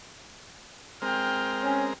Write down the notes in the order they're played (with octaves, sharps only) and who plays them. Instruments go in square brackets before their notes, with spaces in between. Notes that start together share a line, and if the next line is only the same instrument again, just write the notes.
[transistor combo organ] G#3 C4 A#4 [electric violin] G5 F6
[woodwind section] C#4